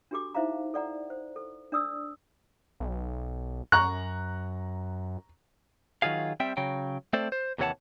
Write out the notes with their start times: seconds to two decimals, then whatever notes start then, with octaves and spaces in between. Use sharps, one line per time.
0.11 D4 F#4 G4 A4 D6
0.35 D#4 E4 C5 E5 F5 A#5
0.74 A4 D5 F#5 A#5
1.10 C5
1.36 A4
1.72 D4 D5 D#6 E6
2.80 B1
3.72 F#2 A#5 C#6 F#6
6.02 D#3 F#3 F4 G#4 F5
6.40 G3 C4 E5 G5
6.57 C#3 F#3 G5
7.13 A3 C4 A4 C5 D5
7.32 C5
7.58 D#2 C3 E3 C#5 F#5 A5